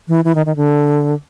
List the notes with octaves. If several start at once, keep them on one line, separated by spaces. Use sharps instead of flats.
E3
E3
D#3
D#3
D3